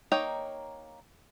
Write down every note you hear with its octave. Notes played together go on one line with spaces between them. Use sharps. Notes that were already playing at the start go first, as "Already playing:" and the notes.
A#3 D#4 C#5 D#5 G5